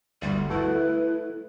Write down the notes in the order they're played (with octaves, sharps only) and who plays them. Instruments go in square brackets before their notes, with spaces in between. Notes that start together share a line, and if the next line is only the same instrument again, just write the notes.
[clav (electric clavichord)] G1 D2 [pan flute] G3
[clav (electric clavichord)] A3 F#4 A4 [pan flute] E4 [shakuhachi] B4
[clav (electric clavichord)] A3